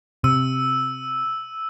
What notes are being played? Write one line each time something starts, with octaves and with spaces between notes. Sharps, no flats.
C3 E6 D#7